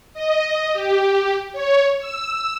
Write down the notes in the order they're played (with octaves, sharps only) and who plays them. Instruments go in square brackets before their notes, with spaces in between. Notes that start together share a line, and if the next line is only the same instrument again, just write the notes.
[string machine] D#5
G4
C#5
E6